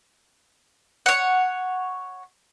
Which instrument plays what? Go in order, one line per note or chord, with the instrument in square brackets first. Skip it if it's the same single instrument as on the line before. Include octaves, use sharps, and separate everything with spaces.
[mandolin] C#5 F#5